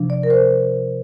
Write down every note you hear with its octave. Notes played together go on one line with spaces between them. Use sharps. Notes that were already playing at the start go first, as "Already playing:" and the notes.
Already playing: C3 F3 D4
D5
A#4
C5